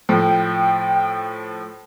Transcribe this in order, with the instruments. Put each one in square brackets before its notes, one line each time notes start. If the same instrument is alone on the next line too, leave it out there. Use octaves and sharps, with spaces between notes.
[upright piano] A2 F3 [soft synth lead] G5